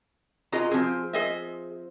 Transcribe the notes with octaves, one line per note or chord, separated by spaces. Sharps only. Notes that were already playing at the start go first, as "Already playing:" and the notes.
F4 F#4 G#4 D#5 A#5
F3 C4 G#4
G#4 D#5 E5